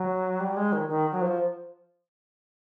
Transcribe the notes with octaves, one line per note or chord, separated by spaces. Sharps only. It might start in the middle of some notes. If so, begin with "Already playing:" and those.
Already playing: F#3
G3
G#3
D#3
D#3
F#3
F3